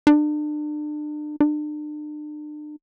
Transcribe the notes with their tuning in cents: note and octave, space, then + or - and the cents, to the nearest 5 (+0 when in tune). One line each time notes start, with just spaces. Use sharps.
D4 +35
D4 +40